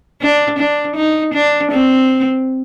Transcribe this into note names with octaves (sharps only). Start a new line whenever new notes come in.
D4
D4
D#4
D4
C4